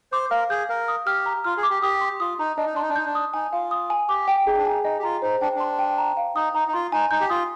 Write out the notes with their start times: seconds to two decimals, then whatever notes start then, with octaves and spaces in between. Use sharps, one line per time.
0.12 C5 D6
0.31 A#4 F5
0.50 G#4 G6
0.69 A#4 F5
0.88 D#6
1.06 G4 F6
1.26 A#5
1.44 F4 F6
1.57 G#4
1.63 D6
1.70 G4
1.82 G4 D#6
2.01 C6
2.20 F4 D#6
2.39 D#4 A#5
2.57 D4 D#5
2.66 D#4
2.74 D4 C6
2.82 D#4
2.90 D4
2.96 D#4 G6
3.06 D4
3.15 D#6
3.34 D#4 G#5
3.53 F4 F5
3.71 D#6
3.90 G#5
4.09 G4 D6
4.28 G5
4.46 D#4 G#4
4.57 D4
4.65 D#4 G#5
4.84 D#4 D#5
4.99 G4
5.03 F4 A#5
5.22 D#4 C5
5.41 D4 G5
5.56 D4 C6
5.79 G5
5.98 A#5
6.17 F5
6.35 D#4 D#6
6.55 D#4 A#5
6.68 D#4
6.73 F4 C6
6.92 D#4 G#5
7.11 D#4 G6
7.21 G4
7.30 F4 D#6